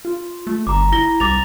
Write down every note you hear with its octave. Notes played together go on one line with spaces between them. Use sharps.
F4
A3
G1 A#5 D6
E4 A#6 G7
C2 D6 A6 F7